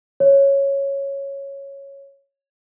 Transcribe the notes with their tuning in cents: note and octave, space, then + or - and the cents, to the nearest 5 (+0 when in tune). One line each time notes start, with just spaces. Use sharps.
C#5 -5